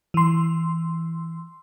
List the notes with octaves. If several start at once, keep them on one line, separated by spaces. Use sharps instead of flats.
E3 C6